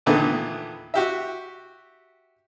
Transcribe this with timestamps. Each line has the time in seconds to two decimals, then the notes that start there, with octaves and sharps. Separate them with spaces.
0.06 E2 A#2 D3 D#3 A3 B3
0.94 F#4 G4 E5